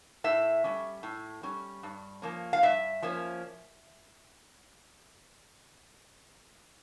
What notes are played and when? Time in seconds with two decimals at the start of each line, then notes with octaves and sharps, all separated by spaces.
0.24 A2 E5
0.64 G3 C#4
1.03 A2
1.43 G3 C#4
1.83 G2
2.22 F3 A#3 C#4
2.53 F5
2.62 G2 E5
3.02 F3 A#3 C#4